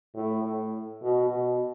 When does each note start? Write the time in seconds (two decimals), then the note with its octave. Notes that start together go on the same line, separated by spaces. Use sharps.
0.15 A2
0.44 A2
1.02 B2
1.30 B2